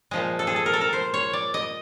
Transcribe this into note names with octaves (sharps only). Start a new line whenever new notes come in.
A#2 F3 G#3 D#5
A4
G#4
A4
A#4
A4
A#4
C5
C#5
D5
D#5